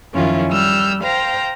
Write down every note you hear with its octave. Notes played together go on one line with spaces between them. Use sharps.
F#2 D#3 F3 C#4 E4 F4
G3 E6 F6 G6
C5 F5 G5 A#5